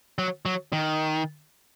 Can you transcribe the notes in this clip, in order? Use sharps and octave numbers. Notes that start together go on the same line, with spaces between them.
F#3
F#3
D#3